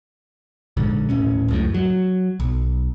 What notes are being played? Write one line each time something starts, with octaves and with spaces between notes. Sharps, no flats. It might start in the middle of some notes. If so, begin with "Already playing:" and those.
A#1 G#2 D3
D#1 A2 C#4
C#2 F#2 A2
F#3
B1